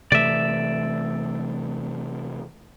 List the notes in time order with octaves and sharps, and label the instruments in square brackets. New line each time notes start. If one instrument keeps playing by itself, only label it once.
[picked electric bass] C3 E3 A3 [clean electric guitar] D5 E5